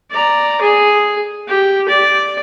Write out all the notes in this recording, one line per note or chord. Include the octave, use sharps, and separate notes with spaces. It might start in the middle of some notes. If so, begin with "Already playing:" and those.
D5 A#5
G#4
G4
D5